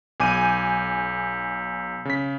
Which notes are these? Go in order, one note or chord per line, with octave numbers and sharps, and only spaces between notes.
B1 G#5 D6 G6 D#7
C#3 B6